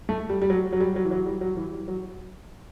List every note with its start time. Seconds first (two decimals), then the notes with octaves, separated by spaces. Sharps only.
0.09 A3
0.30 G3
0.42 G3
0.50 F#3
0.73 F#3
0.81 G3
0.96 F#3
1.05 E3
1.11 F#3
1.26 G3
1.41 F#3
1.57 E3
1.72 G3
1.88 F#3